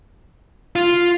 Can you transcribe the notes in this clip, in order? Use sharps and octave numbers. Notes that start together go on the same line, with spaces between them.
F4